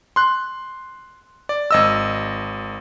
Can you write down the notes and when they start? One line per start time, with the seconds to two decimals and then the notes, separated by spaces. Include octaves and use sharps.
0.16 C6 F#6
1.49 D5
1.71 G#1 D#5 E6